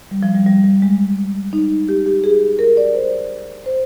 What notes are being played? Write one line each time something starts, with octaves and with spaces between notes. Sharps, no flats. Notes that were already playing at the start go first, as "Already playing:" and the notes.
G3
F3
G3
G3
G3
G#3
D#4
G4
G4
G#4
A#4
D5
C5
C5